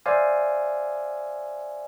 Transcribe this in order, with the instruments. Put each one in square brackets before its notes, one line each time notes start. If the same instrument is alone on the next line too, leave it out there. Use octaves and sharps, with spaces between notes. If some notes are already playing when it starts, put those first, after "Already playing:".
[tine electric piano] C5 D5 E5 F5 G#5